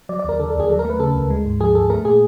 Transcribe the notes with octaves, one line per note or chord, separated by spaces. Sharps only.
F#3 D5
D5
D#2 A#4
D3 A4
A4
D#2 G#4
F#3 A4
A#4
A3
B4
C#3 A4
D2
G#3
G#2
F3 G#4
G#2 A4
A3 A#4
A#2 G#4